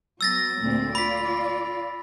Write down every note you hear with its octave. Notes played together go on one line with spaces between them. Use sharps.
F#3 B3 E6 A6 A#6
D2 A#2 C4
F4 D5 B5 B6